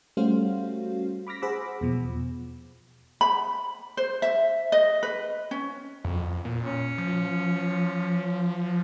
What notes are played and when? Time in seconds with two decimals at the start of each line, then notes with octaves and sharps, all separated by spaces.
0.17 G3 A3 C#4 F#4 C5 F5
1.27 B5 D6 F6 A#6 B6
1.42 G#4 C5 F#5 B5 D6 E6
1.81 E2 B2 F3
3.21 B5
3.97 C5
4.22 E5
4.72 D#5
5.03 B4
5.51 C#4
6.05 F2
6.45 A#2
6.63 C#4
6.98 F3